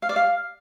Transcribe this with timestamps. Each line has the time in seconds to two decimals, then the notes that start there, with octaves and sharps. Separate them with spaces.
0.02 F5
0.09 D5
0.16 F5